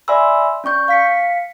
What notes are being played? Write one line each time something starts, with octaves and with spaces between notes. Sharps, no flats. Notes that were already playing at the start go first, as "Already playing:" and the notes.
D5 E5 G#5 B5 C6 E6
C#4 D5 C#6 G6
F5 B6 C#7